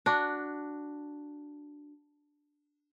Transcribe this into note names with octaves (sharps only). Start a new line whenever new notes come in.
D4 F#4